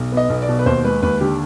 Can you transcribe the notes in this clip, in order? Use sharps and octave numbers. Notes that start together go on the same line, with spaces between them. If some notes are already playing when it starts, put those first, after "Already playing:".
Already playing: B1
B3 D#5
B1
D5
B2
B4
D#2 C5
G#3 B4
D#2 B4
D3 G4